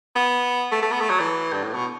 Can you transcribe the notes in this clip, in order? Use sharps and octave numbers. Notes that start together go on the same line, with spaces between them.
B3
A3
A3
B3
A3
F#3
E3
G2
A2
B2